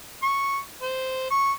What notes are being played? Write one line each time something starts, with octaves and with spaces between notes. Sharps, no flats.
C#6
C5
C#6